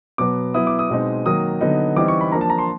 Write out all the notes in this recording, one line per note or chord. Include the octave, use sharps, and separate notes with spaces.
B2 F#3 B3 D6
F#3 B3 E4 D#6
D6
D#6
B2 G#3 C4 D#4
D#3 F#3 A#3 D#6
D3 F#3 B3 D#4
E3 G3 C4 D#4 D6
C#6
B5
F3 A#3 D4 A#5
A5
A#5
C6